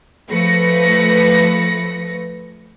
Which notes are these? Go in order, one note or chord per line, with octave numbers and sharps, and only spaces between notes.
F3 A3 B4 A#6 C#7